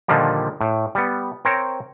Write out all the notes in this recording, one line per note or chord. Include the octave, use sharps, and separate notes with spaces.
A#2 D3 D#3 F3 G3 A#3
A2
G3 B3
C4 A#4 C5 C#5 G5